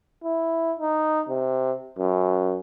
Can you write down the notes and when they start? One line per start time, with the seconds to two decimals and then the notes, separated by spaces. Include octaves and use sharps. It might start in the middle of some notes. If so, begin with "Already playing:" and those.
0.24 E4
0.80 D#4
1.29 C3
1.99 F#2